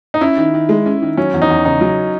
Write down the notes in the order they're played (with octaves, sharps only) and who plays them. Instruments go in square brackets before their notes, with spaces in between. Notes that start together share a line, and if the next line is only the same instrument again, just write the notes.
[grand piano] D#4
[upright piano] C#4 [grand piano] E4
[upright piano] D#3
D#3
G#3
C#4
D#3
[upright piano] F#3 [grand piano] C#4
[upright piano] E2
[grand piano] D#4
[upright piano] E2
[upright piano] C#3 [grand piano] D#4
[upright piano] F#3